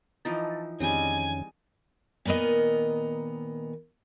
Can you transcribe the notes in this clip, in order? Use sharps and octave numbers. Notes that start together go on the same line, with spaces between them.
E3 F3 D#4 A5
F2 D#3 G3 G#3 C4 C#4 G#5
A#2 D#3 B3 A#4 D#5